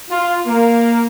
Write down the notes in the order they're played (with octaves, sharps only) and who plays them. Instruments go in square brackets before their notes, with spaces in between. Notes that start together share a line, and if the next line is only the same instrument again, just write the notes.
[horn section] F4
A#3